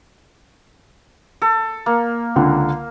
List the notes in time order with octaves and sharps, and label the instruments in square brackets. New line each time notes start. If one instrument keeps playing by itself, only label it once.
[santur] A4
A#3
[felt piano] C#2 D3